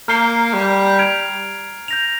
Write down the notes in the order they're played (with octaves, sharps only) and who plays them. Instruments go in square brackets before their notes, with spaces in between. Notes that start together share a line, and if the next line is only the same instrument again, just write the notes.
[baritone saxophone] A#3 [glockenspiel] A#5 F6 C7 G7
[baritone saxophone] G3
[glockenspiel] F6 G#6 D7 F7
G6 A#6 F7